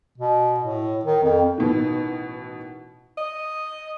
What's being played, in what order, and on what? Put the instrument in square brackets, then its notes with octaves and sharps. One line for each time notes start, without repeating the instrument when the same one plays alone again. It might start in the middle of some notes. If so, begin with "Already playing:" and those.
[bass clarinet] B2
A2
D#3
F2
[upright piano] A1 B2 D#3
[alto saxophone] D#5